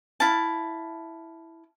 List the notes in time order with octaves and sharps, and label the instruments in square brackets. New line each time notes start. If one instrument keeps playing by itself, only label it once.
[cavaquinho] E4 F5 A5